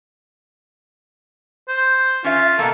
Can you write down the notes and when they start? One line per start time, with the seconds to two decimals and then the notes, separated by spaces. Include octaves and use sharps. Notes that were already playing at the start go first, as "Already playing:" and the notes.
1.68 C5
2.24 C#4 F4 E5
2.59 B2 A#3 A4